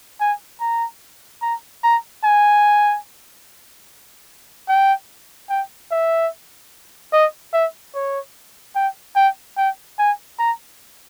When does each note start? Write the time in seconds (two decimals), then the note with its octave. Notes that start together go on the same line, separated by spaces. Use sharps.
0.20 G#5
0.61 A#5
1.42 A#5
1.84 A#5
2.24 G#5
4.69 G5
5.50 G5
5.91 E5
7.13 D#5
7.54 E5
7.95 C#5
8.76 G5
9.16 G5
9.58 G5
9.99 G#5
10.39 A#5